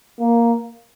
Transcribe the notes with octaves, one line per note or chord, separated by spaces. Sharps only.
A#3